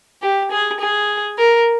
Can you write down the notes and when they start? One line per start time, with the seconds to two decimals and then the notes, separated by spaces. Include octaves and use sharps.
0.22 G4
0.51 G#4
0.80 G#4
1.39 A#4